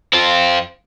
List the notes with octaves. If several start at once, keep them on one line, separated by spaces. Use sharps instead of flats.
C4 F4